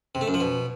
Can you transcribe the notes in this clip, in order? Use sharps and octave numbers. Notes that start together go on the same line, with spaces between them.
C3
A3
F#2
F3
B2